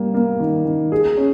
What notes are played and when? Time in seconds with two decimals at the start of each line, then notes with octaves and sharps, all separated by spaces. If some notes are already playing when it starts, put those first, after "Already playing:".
Already playing: G3 A#3
0.14 A#3
0.40 D#3
0.66 D#3
0.92 G#4
1.17 C#4